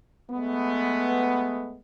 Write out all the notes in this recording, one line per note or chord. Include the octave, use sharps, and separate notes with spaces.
G#3 A3 B3